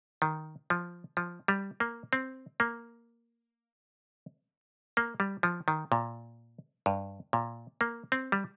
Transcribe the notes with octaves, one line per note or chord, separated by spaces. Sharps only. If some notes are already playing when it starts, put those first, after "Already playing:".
D#3
F3
F3
G3
A#3
C4
A#3
A#3
G3
F3
D#3
A#2
G2
A#2
A#3
C4
G3